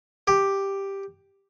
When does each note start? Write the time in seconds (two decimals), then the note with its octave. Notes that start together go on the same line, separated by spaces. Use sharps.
0.28 G4